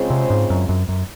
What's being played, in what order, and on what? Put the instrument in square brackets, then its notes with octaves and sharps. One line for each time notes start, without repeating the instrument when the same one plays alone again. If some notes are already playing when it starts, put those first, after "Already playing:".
Already playing: [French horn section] C#3 G#3 C4 F4 C5
[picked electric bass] C3
G#2
F#2
F#2
F#2